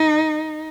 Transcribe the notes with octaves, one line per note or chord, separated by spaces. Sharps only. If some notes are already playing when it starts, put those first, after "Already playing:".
Already playing: D#4